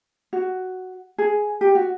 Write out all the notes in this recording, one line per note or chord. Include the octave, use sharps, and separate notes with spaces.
F#4
G#4
G4
F#4